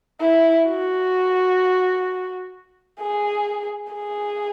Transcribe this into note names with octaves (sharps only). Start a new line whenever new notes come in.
E4
F#4
G#4
G#4